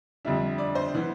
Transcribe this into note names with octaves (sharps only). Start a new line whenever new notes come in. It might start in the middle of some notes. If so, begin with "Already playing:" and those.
F2 D3 G3 D4 E5
D5
C5
E3 B3